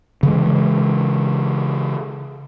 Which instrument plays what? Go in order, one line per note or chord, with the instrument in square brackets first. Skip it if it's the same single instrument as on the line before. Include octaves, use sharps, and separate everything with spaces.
[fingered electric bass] C#3 E3 G#3